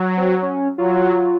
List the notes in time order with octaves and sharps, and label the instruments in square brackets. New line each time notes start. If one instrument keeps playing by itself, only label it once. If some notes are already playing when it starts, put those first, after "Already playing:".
Already playing: [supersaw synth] F#3
[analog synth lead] C4
C#4
[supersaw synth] F#3 [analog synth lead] F4